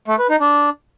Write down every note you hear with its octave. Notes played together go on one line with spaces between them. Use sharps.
A3
B4
D#4
D4